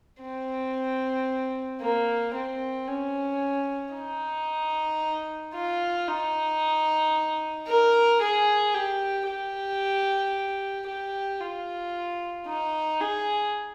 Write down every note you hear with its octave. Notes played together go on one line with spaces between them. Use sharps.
C4
A#3
C4
C#4
D#4
F4
D#4
A#4
G#4
G4
G4
G4
F4
D#4
G#4